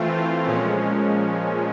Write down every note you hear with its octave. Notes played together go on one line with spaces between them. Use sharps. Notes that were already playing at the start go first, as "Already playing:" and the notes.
Already playing: E3 A3 C4 F4
A#2 F3 G#3 C#4